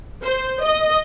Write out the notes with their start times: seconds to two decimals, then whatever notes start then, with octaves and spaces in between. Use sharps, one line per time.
0.23 C5
0.64 D#5